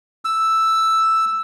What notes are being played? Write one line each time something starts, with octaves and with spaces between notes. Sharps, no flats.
E6